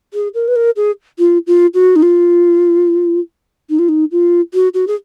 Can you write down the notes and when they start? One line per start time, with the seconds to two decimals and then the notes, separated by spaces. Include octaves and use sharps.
0.14 G#4
0.34 A#4
0.48 B4
0.56 A#4
0.76 G#4
1.18 F4
1.47 F4
1.74 F#4
1.96 D#4
2.02 F4
3.70 D#4
3.79 F4
3.89 D#4
4.11 F4
4.54 F#4
4.74 F#4
4.87 G#4